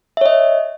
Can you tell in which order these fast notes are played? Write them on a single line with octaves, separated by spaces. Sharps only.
E5 C#5 D#5